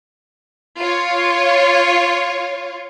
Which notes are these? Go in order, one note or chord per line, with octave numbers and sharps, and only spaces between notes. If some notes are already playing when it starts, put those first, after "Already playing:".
F4 C#5